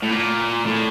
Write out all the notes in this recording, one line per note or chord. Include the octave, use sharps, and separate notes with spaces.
A2
A#2
A2